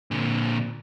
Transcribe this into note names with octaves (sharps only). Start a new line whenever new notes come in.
A#2 D3